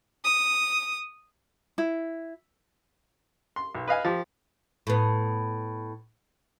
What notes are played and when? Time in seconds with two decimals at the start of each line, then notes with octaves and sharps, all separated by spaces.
0.24 D#6
1.78 E4
3.56 C6
3.75 B1
3.88 B4 D#5 F5 G#5
4.05 F3 G4
4.87 A2 B3